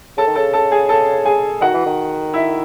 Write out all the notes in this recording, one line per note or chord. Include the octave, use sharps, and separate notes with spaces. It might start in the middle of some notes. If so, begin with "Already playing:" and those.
C#3 A4 A5
D#3
C#3 A4 A5
A4 A5
G#4 G#5
A4 A5
G#4 G#5
D#3 F#4 F#5
E3
D#3
E4 E5